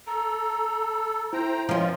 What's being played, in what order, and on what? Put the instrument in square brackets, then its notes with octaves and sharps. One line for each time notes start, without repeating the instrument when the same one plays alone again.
[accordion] A4 [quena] A#5
[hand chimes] E4 [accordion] C5 G5 A#5
[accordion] B2 F4 [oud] F3 C#4 [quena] C6